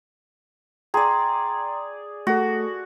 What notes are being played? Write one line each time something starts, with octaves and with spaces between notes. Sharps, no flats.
G#4 D5 G5 A#5 C6
A3 F#4 A4